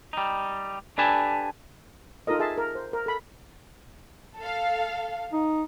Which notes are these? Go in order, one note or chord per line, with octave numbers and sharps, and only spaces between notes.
G3 D#4
D4 G4 A4 B4 G#5 A5
D#4 F4 A4 A#4 D#5
G#4 E5 A5 C6
A#4
C5
A#4
A4 B5
A4 F5
D#4